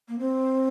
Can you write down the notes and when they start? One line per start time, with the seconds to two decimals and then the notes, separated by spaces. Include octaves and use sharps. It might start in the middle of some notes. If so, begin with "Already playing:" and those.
0.08 A#3
0.19 C4